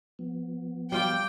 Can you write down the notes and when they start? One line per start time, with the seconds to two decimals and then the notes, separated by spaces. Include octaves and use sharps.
0.19 F3 B3
0.92 G3 F4 G4 G5